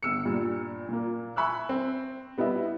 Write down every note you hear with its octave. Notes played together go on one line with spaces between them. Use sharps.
G1 E6 C#7
G2 A#2
A#2 A#3
E5 G#5 B5 C#6 E6 F#6
C4
G3 B3 E4 D#5 E5